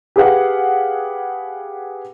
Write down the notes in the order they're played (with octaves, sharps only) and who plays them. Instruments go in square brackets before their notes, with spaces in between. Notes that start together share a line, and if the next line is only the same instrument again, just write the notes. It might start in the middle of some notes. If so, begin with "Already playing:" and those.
[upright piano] G4 G#4 B4 F5 F#5